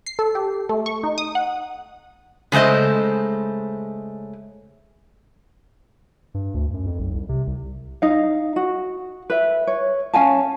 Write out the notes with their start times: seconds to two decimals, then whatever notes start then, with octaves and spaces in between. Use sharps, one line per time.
0.06 C7
0.19 A4
0.35 G4
0.69 A3
0.86 C#6
1.03 D#4
1.18 D#6
1.35 F#5
2.52 C#3 G#3 A3 C5 D#5
6.34 G2
6.54 D2
6.74 F#2
6.86 F2
6.99 B1
7.14 C2
7.29 C3
7.47 C2
8.02 D#4 F5
8.56 F#4
9.30 B4 E5
9.67 C#5
10.14 C#4 F5 G#5 A5